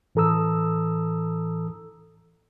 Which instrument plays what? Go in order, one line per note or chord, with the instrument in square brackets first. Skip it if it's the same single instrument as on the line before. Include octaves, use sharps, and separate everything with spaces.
[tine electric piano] A2 E3 A4 A#5 D#6 E6